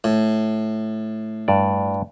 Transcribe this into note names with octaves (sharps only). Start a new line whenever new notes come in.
A2
G2 D5